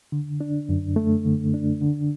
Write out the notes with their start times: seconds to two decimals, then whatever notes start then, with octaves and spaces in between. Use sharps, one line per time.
0.12 D3
0.41 D4
0.69 F#2
0.96 A3
1.25 D3
1.54 D4
1.81 D3